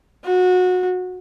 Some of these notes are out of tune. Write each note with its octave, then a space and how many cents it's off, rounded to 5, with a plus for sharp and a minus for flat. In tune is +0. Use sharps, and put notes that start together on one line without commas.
F#4 -20